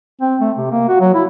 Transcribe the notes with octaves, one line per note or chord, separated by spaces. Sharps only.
C4
A3
C3
A#3
F#4
F#3
E4